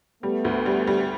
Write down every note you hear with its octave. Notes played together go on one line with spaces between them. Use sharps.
G3 A3 B3
D2
G3
G3